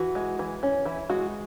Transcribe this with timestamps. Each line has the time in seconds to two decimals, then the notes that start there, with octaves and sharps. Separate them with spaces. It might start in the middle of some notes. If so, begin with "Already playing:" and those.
Already playing: E3 F#4
0.15 G#3
0.39 E3
0.63 C#4
0.85 E3 E4
1.10 G#3 F#4